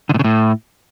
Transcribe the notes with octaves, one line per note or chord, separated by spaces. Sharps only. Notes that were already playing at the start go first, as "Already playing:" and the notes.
D3
A2
C#3
A2